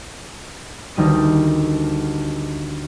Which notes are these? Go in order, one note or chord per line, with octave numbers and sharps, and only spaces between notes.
D2 D#3 G3 D#6 D#7